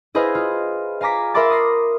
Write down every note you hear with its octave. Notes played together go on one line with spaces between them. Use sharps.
E4 G#4 B4 C5 D#5 F5
F4
F5 G#5 A#5 D6 B6
A#4 E5 B5 C6 D6 A6
D#6 A#6 C7